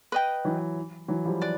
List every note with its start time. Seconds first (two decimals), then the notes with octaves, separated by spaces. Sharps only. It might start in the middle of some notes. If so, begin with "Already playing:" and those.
0.12 B4 D#5 G5
0.45 E3 F#3
1.08 E3 F#3
1.25 F3 G3
1.42 B4 D5